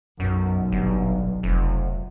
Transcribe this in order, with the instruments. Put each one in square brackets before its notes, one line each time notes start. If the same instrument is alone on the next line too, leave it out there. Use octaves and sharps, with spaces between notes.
[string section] B1 [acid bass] F#2
[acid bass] G1
F1